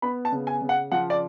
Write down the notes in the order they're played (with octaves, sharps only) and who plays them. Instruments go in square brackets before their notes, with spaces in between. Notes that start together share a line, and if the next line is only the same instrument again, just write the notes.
[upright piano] B3 B5
A5
C#3
G#5
C#3
F#5
F3 F#5
D5